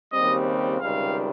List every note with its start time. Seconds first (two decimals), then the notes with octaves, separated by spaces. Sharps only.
0.12 D#2 C#3 G3 C4 D#5
0.80 C#2 C3 D#3 G3 F5